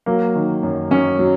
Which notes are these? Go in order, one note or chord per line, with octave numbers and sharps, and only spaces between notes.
F#3 A#3
D#3
F#2
F#2 C#4
F#3